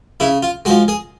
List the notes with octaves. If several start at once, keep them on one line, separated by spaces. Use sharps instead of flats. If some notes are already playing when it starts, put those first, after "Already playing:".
C#3 E4
F4
F3 G#3 F#4
G#4